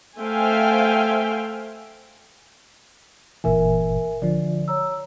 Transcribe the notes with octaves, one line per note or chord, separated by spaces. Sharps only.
A3 C5 E5 F5 G5 G#5
G1 A#2 E3 A#4 E5 G#5
D3 F3 D5
C#5 A#5 E6